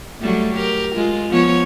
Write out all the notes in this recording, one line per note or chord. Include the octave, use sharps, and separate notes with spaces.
F#3 G3 A3
G4 A#4
G#3 F4
F3 B3 C#5